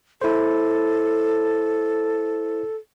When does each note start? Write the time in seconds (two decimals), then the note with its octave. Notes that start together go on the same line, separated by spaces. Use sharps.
0.21 E4 A4 C5